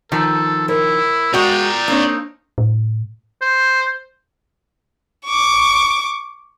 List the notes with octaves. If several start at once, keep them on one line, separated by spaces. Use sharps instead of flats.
D#3 F3 A4
E4 A#4 C5 C#5
G#3 F#4 D5 G5 A#5
A#3 C4 D4 D#4 C#5
A2
C5
C#6 D6